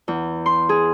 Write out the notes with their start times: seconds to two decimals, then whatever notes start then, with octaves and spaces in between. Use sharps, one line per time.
0.08 E2
0.46 C6
0.69 G#4